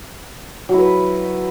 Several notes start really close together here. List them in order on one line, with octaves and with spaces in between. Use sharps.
F#3 E4 B4